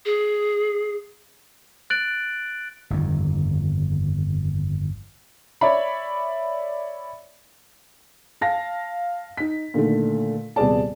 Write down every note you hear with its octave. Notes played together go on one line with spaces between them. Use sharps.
G#4
F#6 A6 D7 F#7
G1 F2 D#3
C#5 D5 E5 B5
F5 A5 A#6
D#4 B6
A#2 D3 D#3 A3
D#1 C3 B3 G#4 D5 A5